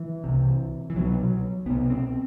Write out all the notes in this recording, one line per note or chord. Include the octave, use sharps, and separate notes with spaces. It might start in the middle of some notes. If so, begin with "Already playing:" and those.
Already playing: E3
C2 C3
E3
C2 B2 F#3
C2 B2 B3
C4